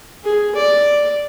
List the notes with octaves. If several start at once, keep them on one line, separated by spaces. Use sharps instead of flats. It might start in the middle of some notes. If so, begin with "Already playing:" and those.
G#4
D5